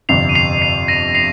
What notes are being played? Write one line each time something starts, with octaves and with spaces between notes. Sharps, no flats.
G1 F2 C3 C7 F7
D#7
C7 F7
C7
A#6 D#7
C7 F7